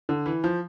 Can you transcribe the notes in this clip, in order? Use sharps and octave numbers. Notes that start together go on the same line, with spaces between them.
D3
E3
F3